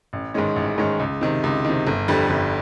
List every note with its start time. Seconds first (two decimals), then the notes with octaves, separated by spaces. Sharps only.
0.13 A1
0.34 G#2 D#3 G#3 C#4
0.56 A1
0.78 G#2 D#3 G#3 C#4
0.99 C#2
1.21 C3 D#3
1.44 C#2
1.65 C3 D#3
1.87 G1
2.08 F2 D3 G3
2.30 G1